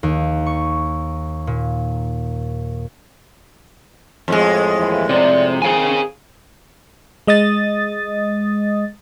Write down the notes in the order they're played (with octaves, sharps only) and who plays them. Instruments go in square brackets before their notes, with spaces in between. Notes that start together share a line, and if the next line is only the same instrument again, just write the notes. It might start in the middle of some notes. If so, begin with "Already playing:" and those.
[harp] D#2
C#6
A#2
[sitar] F2 A2 G#3
[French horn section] D#2 E3
[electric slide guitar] C3 [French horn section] D5
[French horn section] D#3 C4 [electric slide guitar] G#4 F5 G#5
[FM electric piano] G#3 D#5 D#6 A6